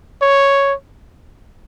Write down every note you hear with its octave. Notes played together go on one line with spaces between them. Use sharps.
C#5